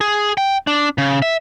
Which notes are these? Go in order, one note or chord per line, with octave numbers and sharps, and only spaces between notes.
G#4
G5
D4
C#3
E5